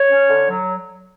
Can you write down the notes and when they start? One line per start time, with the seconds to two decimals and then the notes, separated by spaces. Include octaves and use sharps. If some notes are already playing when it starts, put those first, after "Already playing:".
Already playing: C#5
0.10 C#4
0.29 D3
0.50 F#3